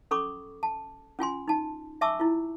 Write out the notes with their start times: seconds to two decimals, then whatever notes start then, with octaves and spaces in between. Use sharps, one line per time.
0.11 C#4 A4 B5 C#6 D6
0.63 A5
1.19 C#4 F4 G#5 C6
1.48 D#4 A5
2.01 E5 G#5 A5 C#6 D6 E6
2.20 E4 F4